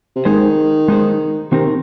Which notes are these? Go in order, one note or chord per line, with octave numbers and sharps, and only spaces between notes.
C3
D#3 G#3 D#4 G#4 C5
G#3 D#4 G#4 C5
C3 D#3 C4 D#4 A#4
C3